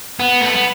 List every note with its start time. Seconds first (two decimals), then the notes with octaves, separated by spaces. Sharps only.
0.20 B3
0.41 A3
0.53 B3